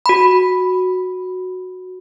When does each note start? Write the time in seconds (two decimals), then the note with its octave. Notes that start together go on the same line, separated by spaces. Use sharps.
0.06 F#4 B5